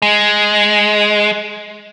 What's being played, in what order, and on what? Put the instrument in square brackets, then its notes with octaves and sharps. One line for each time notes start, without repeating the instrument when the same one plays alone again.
[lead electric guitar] G#3